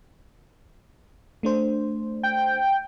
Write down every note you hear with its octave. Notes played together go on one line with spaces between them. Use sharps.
A3 D4 C5
G5